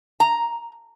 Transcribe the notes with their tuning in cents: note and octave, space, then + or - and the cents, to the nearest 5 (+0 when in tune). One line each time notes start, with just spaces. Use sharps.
A#5 +5